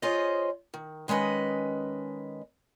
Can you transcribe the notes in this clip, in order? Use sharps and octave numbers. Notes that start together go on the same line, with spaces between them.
F4 G#4 C5 C#5 D#5
D#3
D#3 G#3 C#4 B4 D#5